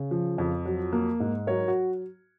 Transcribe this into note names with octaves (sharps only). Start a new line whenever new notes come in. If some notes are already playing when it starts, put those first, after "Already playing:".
Already playing: C#3
F3
F2
F#3
A#3
G#2
F#3 A#4 C#5
F#4